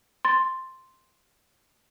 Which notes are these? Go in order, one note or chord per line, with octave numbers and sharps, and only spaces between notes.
C6 A6